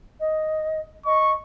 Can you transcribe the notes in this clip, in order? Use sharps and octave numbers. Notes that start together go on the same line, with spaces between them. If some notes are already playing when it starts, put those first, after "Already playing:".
D#5
D#5 C#6